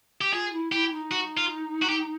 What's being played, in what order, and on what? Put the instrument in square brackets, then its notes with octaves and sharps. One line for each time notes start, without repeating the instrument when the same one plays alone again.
[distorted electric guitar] G4
[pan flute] F4 [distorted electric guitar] G#4
[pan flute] E4
[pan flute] E4 [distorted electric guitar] G4
[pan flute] D#4
[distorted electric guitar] F#4
F4
F#4
G4